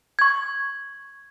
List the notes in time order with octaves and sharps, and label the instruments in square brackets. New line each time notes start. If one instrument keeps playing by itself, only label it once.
[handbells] C#6 G#6